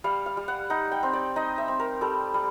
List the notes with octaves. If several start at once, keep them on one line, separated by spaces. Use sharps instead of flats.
G3 F5
F5
G3
F#5
D#4 F#5
G5
C4
D5
D#4 D#5
E5
C4
A#4
G3 A4
G3